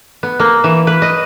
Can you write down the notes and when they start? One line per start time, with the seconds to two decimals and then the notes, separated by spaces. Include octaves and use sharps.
0.23 B3
0.40 A#3
0.64 E3
0.87 B4
1.02 D#5